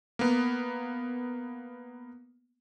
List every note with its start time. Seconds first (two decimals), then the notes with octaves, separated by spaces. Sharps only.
0.19 A#3 B3